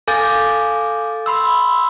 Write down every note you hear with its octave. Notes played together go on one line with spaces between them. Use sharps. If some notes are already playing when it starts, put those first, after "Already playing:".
A4 F5 G#5 D6 G6 A6
B5 C6 E6